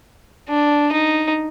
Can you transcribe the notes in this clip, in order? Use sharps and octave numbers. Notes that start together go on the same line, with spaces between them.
D4
D#4